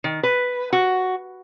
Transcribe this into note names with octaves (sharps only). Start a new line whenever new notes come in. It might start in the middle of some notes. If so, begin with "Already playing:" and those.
D#3
B4
F#4